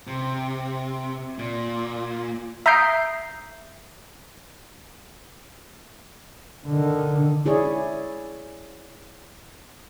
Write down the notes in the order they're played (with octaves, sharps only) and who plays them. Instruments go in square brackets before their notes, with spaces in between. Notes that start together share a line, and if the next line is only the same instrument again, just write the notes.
[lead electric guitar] C3
A#2
[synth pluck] E5 A#5 D#6 G6 C7 D7
[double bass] D3 D#3
[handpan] E4 G#4 C#5 D5